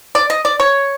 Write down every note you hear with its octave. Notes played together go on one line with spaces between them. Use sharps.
D5
D#5
D5
C#5